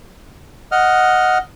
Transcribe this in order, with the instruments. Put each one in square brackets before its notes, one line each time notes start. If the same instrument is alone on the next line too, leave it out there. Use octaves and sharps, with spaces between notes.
[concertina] D#5 F#5 F6